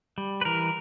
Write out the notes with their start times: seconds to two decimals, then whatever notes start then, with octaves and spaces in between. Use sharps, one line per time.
0.18 G3
0.41 B4
0.45 E3 A#4